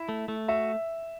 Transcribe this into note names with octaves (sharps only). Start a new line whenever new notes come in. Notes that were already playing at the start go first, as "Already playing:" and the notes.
Already playing: E4
A3
A3
F#4 E5